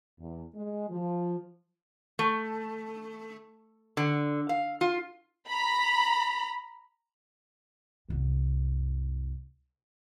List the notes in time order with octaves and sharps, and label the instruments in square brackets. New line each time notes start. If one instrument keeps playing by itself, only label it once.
[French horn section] E2
G#3
F3
[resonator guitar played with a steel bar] A3
D3
F5
F4
[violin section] A#5 B5
[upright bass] C2 F#2